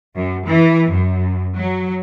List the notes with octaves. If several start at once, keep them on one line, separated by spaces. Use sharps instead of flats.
F#2
E3
F#2
F#3